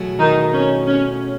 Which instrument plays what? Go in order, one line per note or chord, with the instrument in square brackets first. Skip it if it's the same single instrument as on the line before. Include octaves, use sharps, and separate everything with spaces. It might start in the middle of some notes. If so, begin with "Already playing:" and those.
Already playing: [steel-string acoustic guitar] B2 F#3 A3 E4 G#4
[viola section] D#3 D#4
C#4
C#4